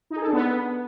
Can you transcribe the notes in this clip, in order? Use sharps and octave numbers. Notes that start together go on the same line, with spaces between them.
D#4
G#4
A4
D4
B3